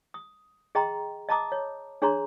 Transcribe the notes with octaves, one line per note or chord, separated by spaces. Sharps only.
D#6
G#4 D#5 G5 A#5 C6
D#5 A5 A#5 D6 D#6
C#5
D4 G#4 C#5 A#5 C6